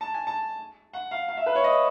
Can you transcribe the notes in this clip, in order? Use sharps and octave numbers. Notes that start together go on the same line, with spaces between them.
A5
G#5
A5
F#5
F5
F5
E5
B4
C#5
D#5